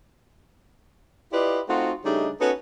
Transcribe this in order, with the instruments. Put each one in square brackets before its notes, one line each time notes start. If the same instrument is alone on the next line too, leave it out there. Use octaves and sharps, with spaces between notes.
[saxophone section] E4 F4 G4 B4 D5 D#5
A3 C4 D#4 F4 F#4
C#3 G3 A3 D4 D#4
B3 C#4 D#4 F#4 A4 B4